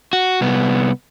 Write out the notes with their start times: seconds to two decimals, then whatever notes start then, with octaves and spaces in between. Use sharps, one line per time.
0.13 F#4
0.41 C2 B3